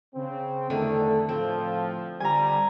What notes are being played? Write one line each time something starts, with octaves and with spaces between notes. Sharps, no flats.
C#3 C4
E2 D3 D#3 A3
A2 F3 C4
D3 G3 G#5 A#5